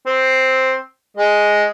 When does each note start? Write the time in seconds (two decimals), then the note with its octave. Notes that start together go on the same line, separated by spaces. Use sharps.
0.06 C4
1.17 G#3 D#5